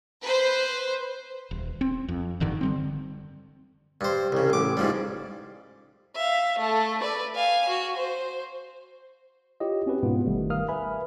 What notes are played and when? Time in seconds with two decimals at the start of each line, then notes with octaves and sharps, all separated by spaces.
0.23 B4 C5
1.51 D#1
1.81 C4
2.08 F2
2.40 E1 G2 D3 D#3
2.61 D3 G3 C4
4.01 G2 C5
4.32 C2 C#3
4.50 A1 D6
4.77 G#2 F3 G3
6.16 E5 F5
6.59 A3 A4
7.01 B4 D5
7.36 F5 G#5
7.69 F#4
7.97 C5
9.60 E4 F4 G4 C#5 D#5
9.86 C4 C#4 F#4 G4 B4
10.03 G#2 B2 B3 F4
10.26 G1 D#3 G3 A3
10.50 A#4 F5 D#6 F6
10.68 B4 E5 G#5 B5